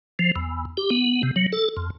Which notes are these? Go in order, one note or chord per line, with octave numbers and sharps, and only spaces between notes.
F3
E2
G4
B3
C3
F#3
A4
F2